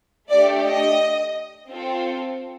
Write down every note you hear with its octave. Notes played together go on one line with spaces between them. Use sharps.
A3 D4 G4 D5
D#5
C4 F4 A4